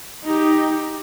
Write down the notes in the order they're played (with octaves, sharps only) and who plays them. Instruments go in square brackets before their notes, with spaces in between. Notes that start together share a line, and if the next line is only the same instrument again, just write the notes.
[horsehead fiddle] D#4 G4